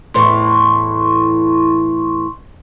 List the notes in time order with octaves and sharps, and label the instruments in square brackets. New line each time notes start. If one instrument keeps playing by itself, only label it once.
[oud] E2 A2 E3 [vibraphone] C6 C#6